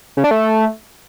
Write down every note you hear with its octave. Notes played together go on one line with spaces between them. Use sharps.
C#3
D4
A3